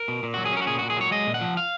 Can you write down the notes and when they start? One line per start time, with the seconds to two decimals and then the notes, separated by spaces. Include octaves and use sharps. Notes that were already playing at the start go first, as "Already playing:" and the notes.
Already playing: A#4
0.08 B2
0.23 A#2
0.34 F#3 F#4
0.45 G#4
0.52 C#4 A#4
0.62 F#4
0.67 A#2 G#4
0.79 A#2 F#4
0.90 G#4
0.97 F#3 C#5
1.11 G#3 D#5
1.27 A#2
1.34 F#5
1.41 F3
1.57 F5